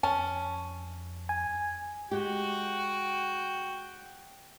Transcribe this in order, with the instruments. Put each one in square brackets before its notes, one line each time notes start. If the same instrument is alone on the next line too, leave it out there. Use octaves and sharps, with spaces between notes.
[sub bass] F2 [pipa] C#4 [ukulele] A5
[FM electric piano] G#5
[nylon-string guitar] G#3 G4 [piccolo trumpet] F#4 [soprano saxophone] G5